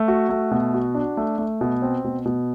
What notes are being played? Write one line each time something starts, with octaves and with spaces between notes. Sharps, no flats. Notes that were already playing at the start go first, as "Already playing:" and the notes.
Already playing: A3
F#4
A3
B2
F#4
D4
A3
A3
B2
C4
B2
B2